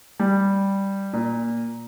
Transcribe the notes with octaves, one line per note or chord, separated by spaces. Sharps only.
G3
A#2